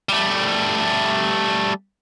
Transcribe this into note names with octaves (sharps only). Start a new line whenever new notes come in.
G3 A3